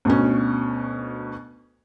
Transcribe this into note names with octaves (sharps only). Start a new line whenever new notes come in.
D2 B2 C#4